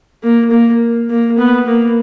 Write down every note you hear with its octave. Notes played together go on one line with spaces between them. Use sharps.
A#3
A#3
A#3
B3
A#3